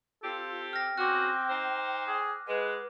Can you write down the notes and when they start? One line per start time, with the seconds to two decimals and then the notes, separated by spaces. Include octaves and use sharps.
0.23 C4 F4 G4 A4
0.73 G5 F6 A#6
0.98 C#3 C4 F#4 D6 F#6
1.49 D#4 C5
2.08 G#4
2.48 G#3 B4 F#5